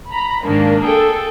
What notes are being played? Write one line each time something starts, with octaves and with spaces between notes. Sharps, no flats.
A#5 B5
G#2 D#3 A#3 D4
G#4 A4 G5